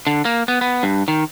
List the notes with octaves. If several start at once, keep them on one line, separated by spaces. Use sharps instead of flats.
D3
A#3
B3
B3
G2
D#3